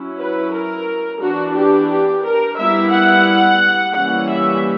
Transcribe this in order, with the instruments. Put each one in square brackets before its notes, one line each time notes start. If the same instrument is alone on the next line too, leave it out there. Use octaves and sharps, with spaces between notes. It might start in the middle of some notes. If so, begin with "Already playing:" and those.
Already playing: [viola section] F#3 C#4 E4
B4
A#4
E3 B3 D4 F#4
G4
G4
A#4
G3 B3 E4 E5
F#5
E3 G3 A#3 C#4 F#5
E5